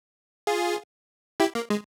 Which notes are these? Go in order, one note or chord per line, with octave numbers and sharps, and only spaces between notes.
F4 G#4
E4 G4
A#3
G#3